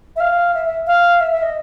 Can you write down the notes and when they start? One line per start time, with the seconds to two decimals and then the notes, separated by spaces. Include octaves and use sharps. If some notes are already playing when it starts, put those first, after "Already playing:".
0.16 E5
0.20 F5
0.54 E5
0.65 E5
0.87 F5
1.21 E5
1.31 E5
1.42 D#5